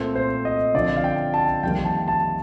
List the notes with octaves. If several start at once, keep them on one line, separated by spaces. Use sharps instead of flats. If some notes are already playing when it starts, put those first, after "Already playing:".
Already playing: A#2 A3 C4
C5
D#5
D3 F3 C4 D5
F5
G5
A5
F2 D#3 G3 A#3 G5
A5
A5